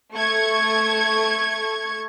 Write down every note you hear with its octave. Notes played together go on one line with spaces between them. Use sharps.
A3 C#6 G#6